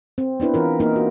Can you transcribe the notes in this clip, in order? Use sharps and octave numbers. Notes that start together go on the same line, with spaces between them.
C4
B3 D4 E4 B4
E3 F4 A#4
A#3 D#4 A#4
F#4